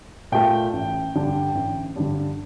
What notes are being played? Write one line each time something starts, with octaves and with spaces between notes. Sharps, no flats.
A#2 A3 G5
A1
G2 D3
A1
G2 D3